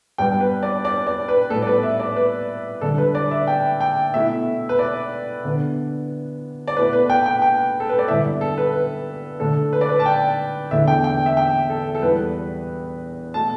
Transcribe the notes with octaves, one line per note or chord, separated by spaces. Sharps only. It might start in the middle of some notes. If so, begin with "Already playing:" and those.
G2 G3 B3 D4 G5
B4
D5
D5
D5
B4
A2 G3 B3 A4
D5
B4
E5
D5
B4
D3 G3 D4 A4
B4
D5
E5
G5
G5
B2 A3 E4 E5
B4
D5
D3 B3 D4
D5
B2 A3 E4 B4
B4
G5
G5
G5
A4
B4
D5
G2 D3 B3 E4 E5
A4
B4
B4
D3 A3 D4 A4
B4
D5
B4
A5
G5
E2 D3 A3 E4 E5
G5
G5
E5
G5
A4
A4
E2 E3 G3 B3 B4
B2 A3 A5